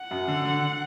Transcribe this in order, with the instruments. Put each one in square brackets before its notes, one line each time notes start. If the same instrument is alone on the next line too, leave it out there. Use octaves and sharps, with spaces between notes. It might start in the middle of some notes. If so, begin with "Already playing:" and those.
Already playing: [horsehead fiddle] F#5
[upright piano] F#2
D3
D3